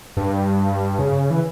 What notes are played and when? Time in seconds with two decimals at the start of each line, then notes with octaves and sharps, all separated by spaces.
0.17 G2
0.99 C#3
1.30 E3